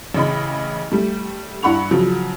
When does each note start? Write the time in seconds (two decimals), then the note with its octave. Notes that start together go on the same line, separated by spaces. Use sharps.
0.14 A1 C#3 D#5 B5
0.92 G3 A3
1.63 G2 E4 F#5 B5 C#6 F7
1.91 C#3 F3 F#3